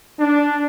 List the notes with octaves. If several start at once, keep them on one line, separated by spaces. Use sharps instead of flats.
D4